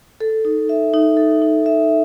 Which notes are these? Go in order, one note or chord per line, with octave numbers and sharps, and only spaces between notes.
A4
D#4
E5
D#4
A4
D#4
E5